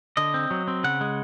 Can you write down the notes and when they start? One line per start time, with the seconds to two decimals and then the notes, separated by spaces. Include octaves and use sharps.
0.17 D3 D#5
0.34 C4
0.51 F#3
0.68 C4
0.84 C#3 F#5
1.01 G#3